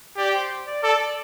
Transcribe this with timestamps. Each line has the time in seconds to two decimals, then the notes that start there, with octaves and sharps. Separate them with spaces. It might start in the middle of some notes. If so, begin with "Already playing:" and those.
0.17 G4 D5
0.34 C5
0.67 D5
0.83 A4 D5
1.00 D5